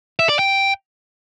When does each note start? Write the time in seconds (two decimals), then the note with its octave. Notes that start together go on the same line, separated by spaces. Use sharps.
0.19 E5
0.29 D5
0.39 G5